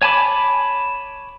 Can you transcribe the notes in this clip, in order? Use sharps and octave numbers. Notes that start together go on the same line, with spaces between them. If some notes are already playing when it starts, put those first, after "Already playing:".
C#5 G#5 A5 B5 D6